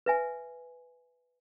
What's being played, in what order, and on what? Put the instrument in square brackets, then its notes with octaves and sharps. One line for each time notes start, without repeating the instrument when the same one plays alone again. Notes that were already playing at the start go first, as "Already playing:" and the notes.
[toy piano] B4 E5 G#5